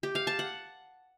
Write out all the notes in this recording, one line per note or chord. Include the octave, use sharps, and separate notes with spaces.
G4
F5
A5
F#5